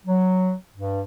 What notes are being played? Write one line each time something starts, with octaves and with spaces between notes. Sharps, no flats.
F#3
G2